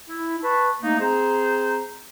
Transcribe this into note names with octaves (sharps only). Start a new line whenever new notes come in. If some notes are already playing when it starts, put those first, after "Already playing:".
E4
B4 A5 B5 C#6
A3 A#3 D#4
C4 G#4 C5 A#5